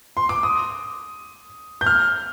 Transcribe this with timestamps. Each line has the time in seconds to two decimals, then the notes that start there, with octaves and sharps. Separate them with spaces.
0.17 C6
0.29 D6
0.43 D#6
1.81 G6
1.86 F6